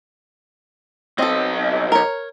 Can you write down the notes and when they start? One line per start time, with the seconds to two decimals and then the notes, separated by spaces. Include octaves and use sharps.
1.18 B1 C4 A4 D#5
1.92 A#4 C#5